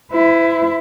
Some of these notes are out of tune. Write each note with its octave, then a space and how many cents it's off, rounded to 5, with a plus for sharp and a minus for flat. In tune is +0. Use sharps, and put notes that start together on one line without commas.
E4 +10 C5 -40